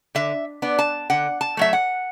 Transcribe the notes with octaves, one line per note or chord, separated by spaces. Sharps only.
D3 E5
B3 D4
A5
D3 F#5
A5
F#3 A3 E5
F#5